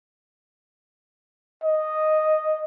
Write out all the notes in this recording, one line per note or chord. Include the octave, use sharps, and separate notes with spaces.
D#5